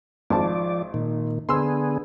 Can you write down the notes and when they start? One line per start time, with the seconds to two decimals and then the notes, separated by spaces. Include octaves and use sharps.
0.30 G#1 F3 D5 A5
0.94 A#2 D#3
1.49 D3 B3 G#4 C6 E6